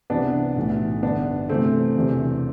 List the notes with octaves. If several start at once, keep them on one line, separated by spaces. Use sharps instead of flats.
C2 C3 E3 B3 D4
B1 A2 E3
G1 G2 D3 B3 D4
D2 C3 E3 A3 C4
E1 E2 C3 E3